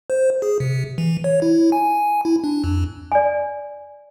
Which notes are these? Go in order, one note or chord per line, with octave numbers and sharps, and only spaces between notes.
C5
G#4
C3
E3
C#5
E4
G#5
E4
D4
F2
D5 G#5